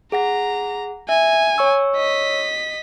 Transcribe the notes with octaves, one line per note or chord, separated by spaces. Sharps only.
G#4 F#5 A#5 A#6
E5 G#5
C#5 C#6 E6
D#5 B6